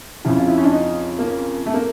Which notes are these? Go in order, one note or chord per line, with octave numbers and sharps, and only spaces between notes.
F2 C#3 F3 E4
F4
E4
C#4
D4
D#4
A#3
A3
A#3